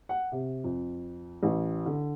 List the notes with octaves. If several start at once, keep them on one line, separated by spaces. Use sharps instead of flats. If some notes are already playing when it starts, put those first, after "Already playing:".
F#5
C3
F2
A1
D3